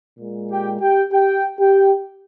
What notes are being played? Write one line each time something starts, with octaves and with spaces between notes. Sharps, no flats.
A#2 G#3
G4 G5
G4 G5
G4 G5
G4 G5